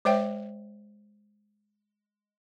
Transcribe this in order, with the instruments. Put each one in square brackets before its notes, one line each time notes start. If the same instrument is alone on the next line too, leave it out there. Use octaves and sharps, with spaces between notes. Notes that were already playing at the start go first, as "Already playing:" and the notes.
[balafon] G#3 C5 C#5 E5 G5